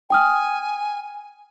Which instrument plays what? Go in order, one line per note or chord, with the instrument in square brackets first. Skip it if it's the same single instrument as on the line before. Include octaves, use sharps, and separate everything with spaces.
[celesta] G5 D#6 F6 [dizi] G#5